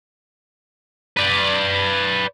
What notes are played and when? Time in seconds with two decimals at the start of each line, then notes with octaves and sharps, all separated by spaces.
1.17 B4 D5